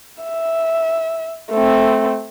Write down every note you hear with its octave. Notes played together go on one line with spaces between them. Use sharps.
E5
A3 C4